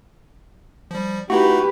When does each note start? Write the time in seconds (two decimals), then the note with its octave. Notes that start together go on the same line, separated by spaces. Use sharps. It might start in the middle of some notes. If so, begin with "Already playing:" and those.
0.91 F3 G3
1.30 A3 D#4 E4 F#4 G4 B4